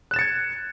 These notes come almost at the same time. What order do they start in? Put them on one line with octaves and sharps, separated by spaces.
F#6 E7 A6 C#7 G#6